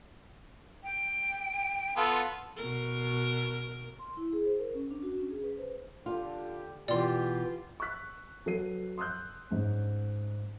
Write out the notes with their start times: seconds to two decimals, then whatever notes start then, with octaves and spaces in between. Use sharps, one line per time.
0.83 G5
1.97 B3 F4 A4 C6
2.57 B2 A#4
3.99 C6
4.17 E4
4.33 G#4
4.46 C5
4.59 A#4
4.75 C#4
4.91 D4
5.03 F#4
5.18 C#4
5.30 G#4
5.44 B4
5.58 C5
6.06 D3 F4 G4
6.88 B2 E3 F4 G4 D5 C6
7.80 C#6 E6 F#6 B6
8.46 F#3 A4 B4 C7 D#7
8.98 C6 D#6 E6 F#6 G6
9.51 G#2 C#4